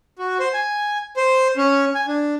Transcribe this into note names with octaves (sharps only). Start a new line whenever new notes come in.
F#4
C5
G#5
C5
C#4
G#5
D4